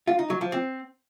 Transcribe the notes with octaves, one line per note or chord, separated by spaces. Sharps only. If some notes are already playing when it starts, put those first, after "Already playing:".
F4
D#4
F#3
F3
C4